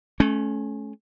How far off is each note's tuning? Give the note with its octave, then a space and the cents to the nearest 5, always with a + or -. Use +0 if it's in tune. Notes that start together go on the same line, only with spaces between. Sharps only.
A3 -30 C#4 +0